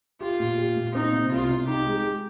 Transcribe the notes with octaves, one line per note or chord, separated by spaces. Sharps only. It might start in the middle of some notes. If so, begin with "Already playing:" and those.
F4 G4
A#2
G4
A#2
C4 D#4
C3
C2 F4
C3
D#4 G4
G#3
G#3